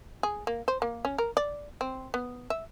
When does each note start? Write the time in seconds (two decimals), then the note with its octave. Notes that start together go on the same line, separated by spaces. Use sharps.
0.23 G#4
0.47 A#3
0.68 C5
0.82 A#3
1.05 C#4
1.18 A#4
1.37 D5
1.81 C4
2.14 B3
2.50 E5